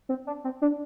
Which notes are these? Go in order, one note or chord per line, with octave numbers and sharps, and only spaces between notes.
C4
D4
C4
D4